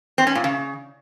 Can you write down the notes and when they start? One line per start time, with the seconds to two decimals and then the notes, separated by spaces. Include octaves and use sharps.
0.18 C4
0.27 C#4
0.35 A#2
0.44 C#3